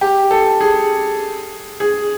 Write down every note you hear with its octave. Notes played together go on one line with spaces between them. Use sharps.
G4
A4
G#4
G#4